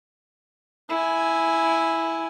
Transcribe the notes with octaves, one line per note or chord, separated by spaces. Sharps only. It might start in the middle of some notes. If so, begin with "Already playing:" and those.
E4 G#5